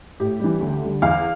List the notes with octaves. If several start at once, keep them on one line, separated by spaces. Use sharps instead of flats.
A2 G4
E3 G3
D2
D3 G3
E2 F5